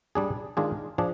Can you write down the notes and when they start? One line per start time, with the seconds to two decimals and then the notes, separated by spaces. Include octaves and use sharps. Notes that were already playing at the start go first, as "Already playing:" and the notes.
0.15 G3 D4 G#4
0.57 D#3 G#3 D4 F4 G#4
0.98 F3 D4 G#4